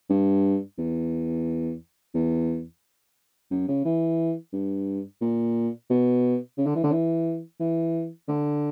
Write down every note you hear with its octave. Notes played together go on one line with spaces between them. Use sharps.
G2
E2
E2
F#2
C#3
E3
G2
A#2
B2
C#3
D3
E3
D3
E3
E3
D3